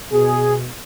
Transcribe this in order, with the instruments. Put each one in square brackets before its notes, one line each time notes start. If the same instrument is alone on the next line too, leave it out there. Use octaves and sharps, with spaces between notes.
[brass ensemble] B2 G#4